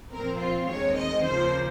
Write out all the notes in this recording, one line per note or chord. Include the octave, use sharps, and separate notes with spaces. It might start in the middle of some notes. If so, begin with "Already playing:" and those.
A#2 F3 C4 A#4
F4
D#2 D#3 G#3 C4 C#5
D#5
D#2 C#3 F3 A#3 C5